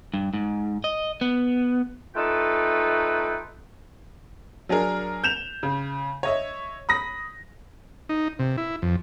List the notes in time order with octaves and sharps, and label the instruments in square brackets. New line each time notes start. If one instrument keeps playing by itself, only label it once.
[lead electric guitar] G2
G#2
D#5
B3
[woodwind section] A3 D#4 F4 A4 B4 G5
[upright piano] F#3 D4 G#4 A#4
G6 E7 F7
C#3
C#5 D#5 E5
B5 D#6 A#6
[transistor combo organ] D#4
C3
E4
F2